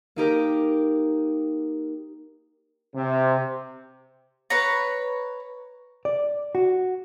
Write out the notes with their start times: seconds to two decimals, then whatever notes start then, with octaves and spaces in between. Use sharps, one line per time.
0.16 A#3 D#4 G4 A#4
2.95 C3
4.50 B4 C#5 A#5
6.05 D5
6.55 F#4